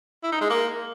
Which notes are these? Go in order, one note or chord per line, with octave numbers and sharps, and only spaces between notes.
E4
D#4
G#3
A#3